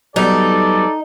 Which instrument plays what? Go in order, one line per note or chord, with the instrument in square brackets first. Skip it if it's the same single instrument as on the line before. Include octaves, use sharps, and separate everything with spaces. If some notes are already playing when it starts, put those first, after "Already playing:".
[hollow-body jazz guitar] F#3 G3 B3 [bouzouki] D#4 [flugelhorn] A4 [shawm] D5